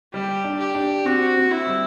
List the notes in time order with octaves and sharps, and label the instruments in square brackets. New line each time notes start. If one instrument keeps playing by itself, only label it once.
[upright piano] G3 [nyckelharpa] G4
[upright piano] D4
[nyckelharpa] G4
[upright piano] D4
[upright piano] C4 [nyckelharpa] F#4
[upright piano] C4
[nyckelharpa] E4
[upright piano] G3